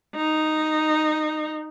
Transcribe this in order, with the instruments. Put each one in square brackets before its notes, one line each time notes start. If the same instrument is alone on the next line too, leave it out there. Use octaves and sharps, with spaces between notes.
[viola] D#4